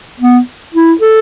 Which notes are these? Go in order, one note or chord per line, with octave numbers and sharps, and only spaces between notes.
B3
E4
A4